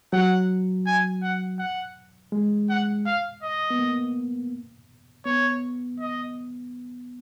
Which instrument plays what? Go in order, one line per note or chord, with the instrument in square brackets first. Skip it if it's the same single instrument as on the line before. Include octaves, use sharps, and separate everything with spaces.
[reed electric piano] F#3 [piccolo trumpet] F#5
[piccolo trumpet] G#5
F#5
F#5
[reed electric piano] G#3
[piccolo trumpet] F#5
F5
D#5
[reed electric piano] B3
A#3
[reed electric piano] B3 [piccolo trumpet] C#5
[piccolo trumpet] D#5